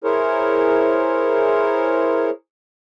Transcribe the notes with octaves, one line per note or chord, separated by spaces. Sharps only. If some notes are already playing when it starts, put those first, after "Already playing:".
E4 G#4 A#4 C5 C#5